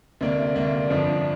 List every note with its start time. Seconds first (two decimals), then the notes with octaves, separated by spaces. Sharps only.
0.21 D2 C3 A#3 D4
0.56 D2 C3 A#3 D4
0.90 G1 F2 F3 D4